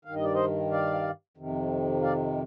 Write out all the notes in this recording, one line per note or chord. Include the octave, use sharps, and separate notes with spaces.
G2 D#3 F5
D#5
D5
C5 D#5
D5 F5
F2 C3 D#3
D5 F5